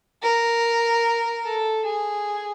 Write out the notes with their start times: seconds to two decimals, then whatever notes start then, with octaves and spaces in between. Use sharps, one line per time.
0.23 A#4
1.45 A4
1.85 G#4